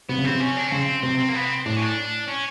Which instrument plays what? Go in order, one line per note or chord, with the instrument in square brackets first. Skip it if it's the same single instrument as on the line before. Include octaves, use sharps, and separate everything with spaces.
[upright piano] C3 [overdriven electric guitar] B3
[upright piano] C#3
[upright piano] C3 [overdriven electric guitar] C4
[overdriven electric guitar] C#4
D4
C#4
[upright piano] C#3 [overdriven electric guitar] C4
[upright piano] C3 [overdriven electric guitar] C4
[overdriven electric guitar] C4
A#3
B3
C4
[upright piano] A2 [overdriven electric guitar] D4
[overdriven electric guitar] C#4
D4
C#4